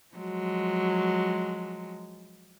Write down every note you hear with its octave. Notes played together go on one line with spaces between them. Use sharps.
F3 F#3 G#3